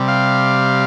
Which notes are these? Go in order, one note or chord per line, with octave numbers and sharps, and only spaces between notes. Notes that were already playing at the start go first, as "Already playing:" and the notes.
Already playing: C3 G3
F5